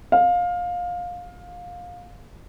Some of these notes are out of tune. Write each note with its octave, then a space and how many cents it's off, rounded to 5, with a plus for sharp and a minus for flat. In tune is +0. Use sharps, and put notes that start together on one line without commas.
F5 +20